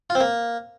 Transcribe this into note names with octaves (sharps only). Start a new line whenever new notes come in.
F4
C4
A#3